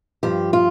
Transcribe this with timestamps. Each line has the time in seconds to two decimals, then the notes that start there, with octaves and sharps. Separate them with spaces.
0.23 G2 F3 G4
0.53 F4